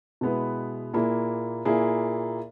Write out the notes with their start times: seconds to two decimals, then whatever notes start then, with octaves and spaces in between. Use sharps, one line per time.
0.21 B2 G#3 B3 E4 B4
0.93 A#2 A#3 E4 G#4
1.65 A#2 A#3 E4 G#4